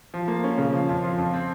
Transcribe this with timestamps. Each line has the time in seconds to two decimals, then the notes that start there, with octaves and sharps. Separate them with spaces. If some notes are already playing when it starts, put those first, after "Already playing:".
0.14 F3
0.28 A#3
0.44 C#4
0.58 C#3
0.73 F3
0.89 F2
1.04 F3
1.18 F2
1.34 C4